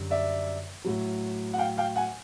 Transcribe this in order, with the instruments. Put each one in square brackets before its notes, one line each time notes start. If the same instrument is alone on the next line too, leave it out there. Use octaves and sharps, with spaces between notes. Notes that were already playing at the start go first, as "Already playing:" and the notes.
Already playing: [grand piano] F#2 D3 G3
D5 E5
A2 F#3
F#5
F5 G5
F5 G5
F#5 G#5